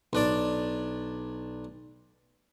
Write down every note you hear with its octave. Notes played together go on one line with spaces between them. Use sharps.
B1 D4 D5